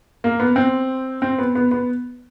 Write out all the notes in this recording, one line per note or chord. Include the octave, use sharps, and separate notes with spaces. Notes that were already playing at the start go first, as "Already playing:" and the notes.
A#3
B3
C4
C4
B3
B3
B3